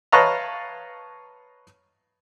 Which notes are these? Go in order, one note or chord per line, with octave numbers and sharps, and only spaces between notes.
B4 C#5 D#5 F5 A5 A#5